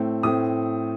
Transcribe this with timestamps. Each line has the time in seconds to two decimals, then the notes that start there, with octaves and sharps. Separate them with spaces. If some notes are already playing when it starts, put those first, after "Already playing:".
Already playing: A2 A3 C4
0.23 A2 A3 C4 D#6